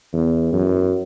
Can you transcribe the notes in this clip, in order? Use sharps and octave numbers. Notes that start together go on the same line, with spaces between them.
E2
F#2